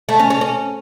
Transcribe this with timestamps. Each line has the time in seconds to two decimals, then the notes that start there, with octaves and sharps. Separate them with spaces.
0.09 A3
0.19 C#4
0.30 C#4
0.41 C#4